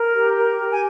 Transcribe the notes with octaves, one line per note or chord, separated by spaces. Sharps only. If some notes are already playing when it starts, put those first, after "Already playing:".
Already playing: A#4
G4
A#4
G4
G#5